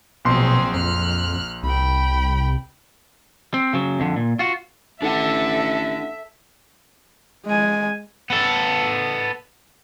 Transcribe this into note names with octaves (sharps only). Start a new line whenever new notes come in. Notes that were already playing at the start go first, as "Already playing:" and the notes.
A#1 B2 F#3 C4 G#4 C6
F2 F6 F#6
C2 G5 B5
C4
C#3 F#3
F2 D3
A#2
F4 F#4
A1 D4 A4 E5 F#5
G#3 G#5
B3 A4